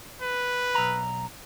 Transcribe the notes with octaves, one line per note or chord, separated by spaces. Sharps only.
B4
B1 A#5